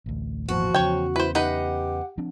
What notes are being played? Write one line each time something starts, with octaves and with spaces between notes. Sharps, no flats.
A1 D2
G#1 E2 A#2 F3 F#4
E2 C#3 C#5 G5
E4 B4 C5
D#4 G4 B4 F#5
F3 C4 D4